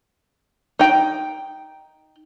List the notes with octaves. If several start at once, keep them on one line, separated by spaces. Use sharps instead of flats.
D#4 G5